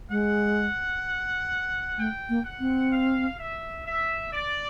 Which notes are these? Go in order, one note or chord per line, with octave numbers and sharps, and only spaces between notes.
G#3 F#5
A3 G5
A#3
F#5
C4
F5
E5
E5
D5